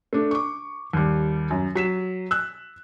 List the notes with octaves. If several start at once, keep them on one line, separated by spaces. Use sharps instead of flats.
A3 D4
C#6 D6
D#2 G3
F#2
F#3 B6 E7
E6 F#6